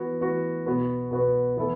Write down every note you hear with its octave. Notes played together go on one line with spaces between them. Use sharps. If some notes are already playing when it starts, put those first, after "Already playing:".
Already playing: E3 B3 F#4
E3 B3 F#4
B2 B3 F#4 B4
B2 B3 F#4 B4
E3 B3 E4 A4